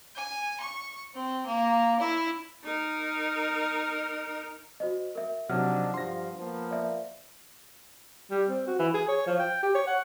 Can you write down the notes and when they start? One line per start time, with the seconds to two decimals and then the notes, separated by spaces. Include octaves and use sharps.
0.15 G#5
0.58 C#6
1.13 C4
1.45 A#3
1.98 E4
2.64 D#4 A#4
4.80 F#4 C5 D#5
5.15 A#4 E5
5.49 C3 F3 F#3 D4 D#4 F#5 F6
5.94 G2 F3 C6 A#6
6.39 F3 A#3 B3
6.71 D5 E5
8.31 G3
8.49 C4
8.67 F#4
8.79 E3
8.94 G#4
9.08 C#5
9.27 F3
9.39 G5
9.63 G4
9.75 C#5
9.87 F#5